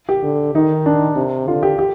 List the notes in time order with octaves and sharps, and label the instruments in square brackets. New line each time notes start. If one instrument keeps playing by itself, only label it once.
[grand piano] G4
[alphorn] D3
[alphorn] D#3 [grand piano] D#4
[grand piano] D4
[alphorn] C3
[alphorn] D3 [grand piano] F4
[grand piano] G4
G4